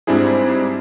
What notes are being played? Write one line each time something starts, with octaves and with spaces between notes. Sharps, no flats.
G#2 G3 C4 D4 E4 G#4